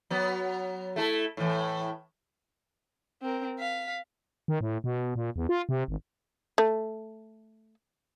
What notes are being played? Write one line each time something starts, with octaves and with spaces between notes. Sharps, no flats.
F#3 B3
A3 E4 A4
A2 E3
C4 A#4
F5 B6
D#3
A2
B2
A#2
E2
F4
C3
G#1
A3